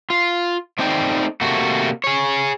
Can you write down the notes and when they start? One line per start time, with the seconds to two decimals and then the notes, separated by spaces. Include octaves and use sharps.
0.10 F4
0.79 A3 C4 D#4 D5 G5
1.41 C3 A3 A#3 F#4
2.04 G#4 C#5